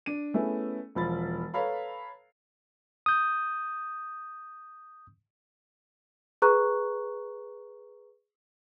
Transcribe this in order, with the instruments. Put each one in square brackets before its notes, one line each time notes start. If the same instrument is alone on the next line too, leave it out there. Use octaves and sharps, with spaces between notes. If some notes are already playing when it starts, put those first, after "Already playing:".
[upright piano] D4 D#7
A3 B3 C#4 E4 G#4
E1 F3 B5 A6
A4 B4 C#5 F5 A#5 B5
[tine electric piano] D#6 G6
[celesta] G#4 B4 A#5 C#6 F#6